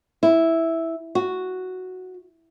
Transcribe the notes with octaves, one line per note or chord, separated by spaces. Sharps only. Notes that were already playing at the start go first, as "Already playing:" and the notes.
E4
F#4